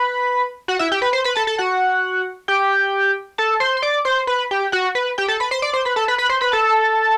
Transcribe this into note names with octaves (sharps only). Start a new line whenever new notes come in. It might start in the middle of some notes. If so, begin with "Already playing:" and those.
Already playing: B4 B5
F#4 F#5
E4 E5
G4 G5
B4 B5
C5 C6
B4 B5
A4 A5
A4 A5
F#4 F#5
G4 G5
A4 A5
C5 C6
C6
D5 D6
C5 C6
B4 B5
G4 G5
F#4 F#5
B4
G4 G5
A4 A5
B4 B5
C5 C6
D5 D6
C5 C6
B4 B5
A4 A5
B4 B5
B4 B5
C5 C6
B4 B5
A4 A5